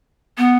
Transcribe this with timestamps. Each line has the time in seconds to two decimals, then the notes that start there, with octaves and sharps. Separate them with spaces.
0.38 B3